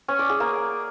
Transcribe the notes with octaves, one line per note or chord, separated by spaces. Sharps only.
C#4
D5
G#4
A#3